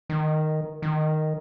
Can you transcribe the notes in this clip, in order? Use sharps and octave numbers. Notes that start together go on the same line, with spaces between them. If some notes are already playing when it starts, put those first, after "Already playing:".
D#3
D#3